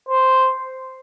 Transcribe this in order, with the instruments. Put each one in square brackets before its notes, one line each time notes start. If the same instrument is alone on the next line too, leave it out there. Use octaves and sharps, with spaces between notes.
[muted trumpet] C5